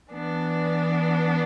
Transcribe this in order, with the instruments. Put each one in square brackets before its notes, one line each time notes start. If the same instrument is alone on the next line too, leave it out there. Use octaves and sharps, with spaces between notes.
[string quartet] E3 B3 D4